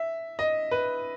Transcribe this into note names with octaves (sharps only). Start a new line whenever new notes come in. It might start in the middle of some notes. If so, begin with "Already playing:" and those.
Already playing: E5
D#5
B4